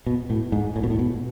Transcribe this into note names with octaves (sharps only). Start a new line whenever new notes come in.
B2
A2
G#2
A2
B2
A2
B2